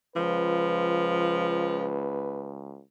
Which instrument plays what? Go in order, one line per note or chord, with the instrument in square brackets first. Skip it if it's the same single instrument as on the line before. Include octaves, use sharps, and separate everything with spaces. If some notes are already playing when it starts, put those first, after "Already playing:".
[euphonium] C#2 [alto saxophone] F3 [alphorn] B4